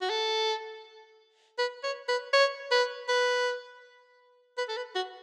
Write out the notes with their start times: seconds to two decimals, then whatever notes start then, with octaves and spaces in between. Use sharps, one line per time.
0.01 F#4
0.10 A4
1.58 B4
1.84 C#5
2.08 B4
2.33 C#5
2.71 B4
3.09 B4
4.57 B4
4.68 A4
4.76 B4
4.95 F#4